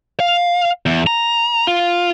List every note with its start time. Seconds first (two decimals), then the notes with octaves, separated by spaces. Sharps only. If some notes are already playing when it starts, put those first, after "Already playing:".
0.20 F5
0.86 E2
1.07 A#5
1.67 F4